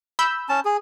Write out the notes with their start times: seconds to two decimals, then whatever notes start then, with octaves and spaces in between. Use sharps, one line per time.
0.19 B5 E6 G6
0.49 C#4 A5
0.65 G#4